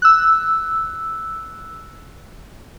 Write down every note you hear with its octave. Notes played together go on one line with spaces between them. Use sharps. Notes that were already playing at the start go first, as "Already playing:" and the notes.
E6 F#6